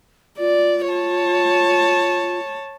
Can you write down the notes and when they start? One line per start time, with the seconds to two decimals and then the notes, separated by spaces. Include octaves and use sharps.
0.39 F4 D5
0.90 C#5 A5